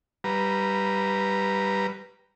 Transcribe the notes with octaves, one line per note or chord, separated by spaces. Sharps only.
G3 B4 A#5